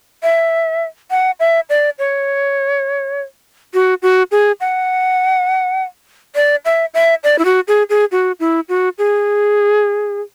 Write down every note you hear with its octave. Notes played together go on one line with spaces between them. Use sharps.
E5
F#5
E5
D5
C#5
F#4
F#4
G#4
F#5
D5
E5
E5
D5
E4
F#4
G#4
G#4
F#4
E4
F#4
G#4